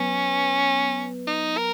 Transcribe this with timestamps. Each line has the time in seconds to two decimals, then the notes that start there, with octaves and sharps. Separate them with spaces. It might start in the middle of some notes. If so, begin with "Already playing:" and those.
Already playing: F#3 B3 C#4 B4
1.27 D#4
1.58 A#4